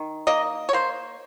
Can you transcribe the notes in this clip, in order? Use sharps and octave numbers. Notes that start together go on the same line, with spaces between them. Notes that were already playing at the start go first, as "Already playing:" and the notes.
Already playing: D#3
A#3 D#5
C#5
A#3 C5